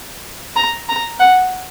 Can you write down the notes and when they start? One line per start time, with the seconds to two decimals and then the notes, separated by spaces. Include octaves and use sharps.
0.56 A#5
0.89 A#5
1.19 F#5